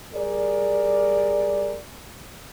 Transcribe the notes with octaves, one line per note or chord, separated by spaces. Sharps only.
G3 G#4 A#4 D5